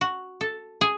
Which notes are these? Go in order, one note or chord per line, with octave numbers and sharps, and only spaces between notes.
F#4
A4
G#4